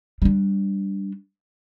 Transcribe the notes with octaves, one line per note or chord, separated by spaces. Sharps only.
G3 D4